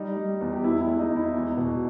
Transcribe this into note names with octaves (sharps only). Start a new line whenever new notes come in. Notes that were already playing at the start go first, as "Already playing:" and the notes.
Already playing: G3 D#4
G3
E2
G4
E2 E4
E4
G#3
D#4
E2 E4
E2
B2